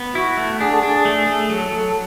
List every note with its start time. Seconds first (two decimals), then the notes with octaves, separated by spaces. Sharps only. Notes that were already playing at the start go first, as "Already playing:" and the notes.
Already playing: B3
0.15 E4 F#4
0.37 A3
0.60 D4 G#4
0.71 A4
0.82 D4 G#4
1.05 A3 G#4
1.27 A3
1.50 F#3 A4
1.72 F#3